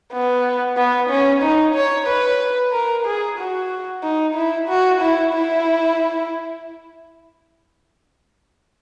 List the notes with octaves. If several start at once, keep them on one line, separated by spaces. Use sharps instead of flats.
B3
B3
C#4
D#4
C#5
B4
A#4
G#4
F#4
D#4
E4
F#4
E4
E4